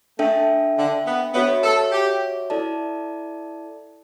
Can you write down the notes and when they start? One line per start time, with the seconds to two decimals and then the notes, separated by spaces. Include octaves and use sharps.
0.19 A3 D4 A4 E5 G5
0.77 D3
1.06 B3
1.34 B3 F#4 C#5 E5
1.64 A4
1.92 G4
2.50 E4 A4 D5 A5